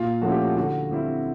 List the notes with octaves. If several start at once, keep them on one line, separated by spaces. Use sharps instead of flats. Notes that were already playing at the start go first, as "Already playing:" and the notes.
Already playing: A#2 F4
F3 A3 C#4 E4 F#4
G4
F#4
D3 F#4
G3 C4 E4